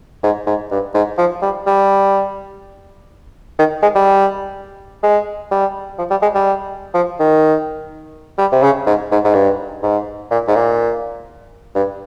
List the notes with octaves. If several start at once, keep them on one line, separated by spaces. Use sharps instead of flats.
G#2
G#2
G2
G#2
F3
G3
G3
D#3
G#3
G3
G#3
G3
F3
G3
G#3
G3
F3
D#3
G3
C3
C#3
G#2
G#2
G#2
G2
G#2
A#2
G#2
A#2
G2